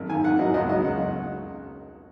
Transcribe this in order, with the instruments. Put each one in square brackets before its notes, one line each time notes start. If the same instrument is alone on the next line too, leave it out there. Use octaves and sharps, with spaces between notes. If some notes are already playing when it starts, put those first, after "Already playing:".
Already playing: [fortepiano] G#1 F#2
D#3 G#5
G#2 F#5
F#3 D#5
C#2 D#5
F#3 D#5
C#3 F#5